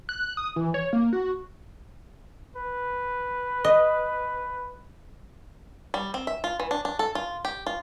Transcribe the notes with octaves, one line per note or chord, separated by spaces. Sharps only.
F#6
D#6
E3
C#5
A#3
F#4
B4
D#5
G3
C4
E5
F4
E3
D4
D4
A4
F4
G4
F4